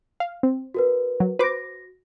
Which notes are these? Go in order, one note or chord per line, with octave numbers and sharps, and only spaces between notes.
F5
C4
F#4 A#4 B4
F#3
F#4 B4 C5 D6 A#6